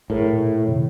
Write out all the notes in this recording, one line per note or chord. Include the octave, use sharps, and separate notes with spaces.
A2 G#4 A#4
A#2
F2 C3 D#3